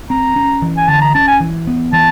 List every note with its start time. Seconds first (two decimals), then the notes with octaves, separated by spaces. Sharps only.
0.10 C4 A#5
0.36 C#4
0.62 E3
0.77 G#5
0.88 D3 A5
1.01 A#5
1.15 C#4 A5
1.28 G#5
1.40 E3
1.67 B3
1.93 E3 A5